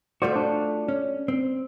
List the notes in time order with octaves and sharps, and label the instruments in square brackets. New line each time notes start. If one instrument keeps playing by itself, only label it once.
[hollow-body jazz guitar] A3 F4 F#4 [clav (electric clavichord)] C5 D5
[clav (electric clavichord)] D4
[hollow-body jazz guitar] C#4
C4